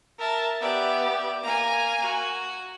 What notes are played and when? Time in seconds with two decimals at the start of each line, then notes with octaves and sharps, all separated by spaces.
0.19 A#4 E5 A5
0.61 B3 G4 D5 E5
1.43 A#3 G#5 A#5
2.02 F#4